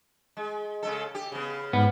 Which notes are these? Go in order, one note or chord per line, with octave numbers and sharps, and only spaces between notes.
G#3
C#3 G#3 A4
G4
C#3 B3
G#2 G3 B3